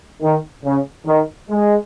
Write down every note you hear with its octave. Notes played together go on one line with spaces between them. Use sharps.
D#3
C#3
D#3
G#3